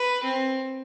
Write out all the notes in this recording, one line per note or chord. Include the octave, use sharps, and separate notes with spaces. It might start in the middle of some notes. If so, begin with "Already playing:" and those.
Already playing: B4
C4